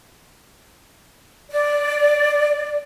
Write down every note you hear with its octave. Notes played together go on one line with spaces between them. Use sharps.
D5